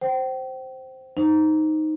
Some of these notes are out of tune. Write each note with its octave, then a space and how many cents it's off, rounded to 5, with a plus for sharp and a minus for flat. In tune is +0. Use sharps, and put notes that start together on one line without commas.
C5 +0 G5 -35
D#4 +0 C5 +0